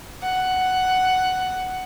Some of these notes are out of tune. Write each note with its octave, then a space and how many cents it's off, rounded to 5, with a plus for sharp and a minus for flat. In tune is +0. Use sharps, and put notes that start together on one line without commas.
F#5 +5